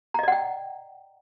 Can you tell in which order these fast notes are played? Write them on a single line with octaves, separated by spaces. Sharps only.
A#5 D#5 D5 F#5 G5